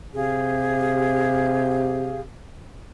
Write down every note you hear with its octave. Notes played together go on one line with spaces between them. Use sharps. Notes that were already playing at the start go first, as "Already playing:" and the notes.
C3 G4 G#4 F5